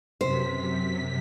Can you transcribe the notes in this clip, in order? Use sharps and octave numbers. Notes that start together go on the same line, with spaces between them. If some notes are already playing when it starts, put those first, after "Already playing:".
F#2 C3 C5 B6